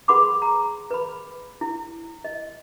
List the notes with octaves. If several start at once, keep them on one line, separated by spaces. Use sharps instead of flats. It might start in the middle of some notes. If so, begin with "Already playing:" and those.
G#4 B4 F#5 B5 C6 D6
A#5
B4 B5
E4
D#5